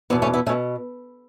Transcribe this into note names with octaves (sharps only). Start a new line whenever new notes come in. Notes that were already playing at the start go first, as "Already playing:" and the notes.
E2 B2 B3
A3 C#4
B3 E4
B2 A3 C#4